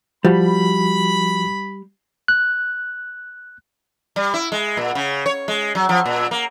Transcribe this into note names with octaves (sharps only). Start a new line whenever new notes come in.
F3 G3 F#4 B5
F#6
G3
E4
G#3
A#2
C#3
C#5
G#3
F#3
F3
A#2
A#3